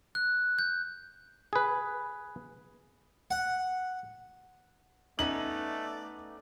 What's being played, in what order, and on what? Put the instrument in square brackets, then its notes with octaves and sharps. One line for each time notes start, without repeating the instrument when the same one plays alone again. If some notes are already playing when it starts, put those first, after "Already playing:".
[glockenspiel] F#6
G6
[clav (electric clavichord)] G#4 B4
[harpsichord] F#5
[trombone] A3 [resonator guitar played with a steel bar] B3 C#4 D#4 [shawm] D5 [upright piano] F#7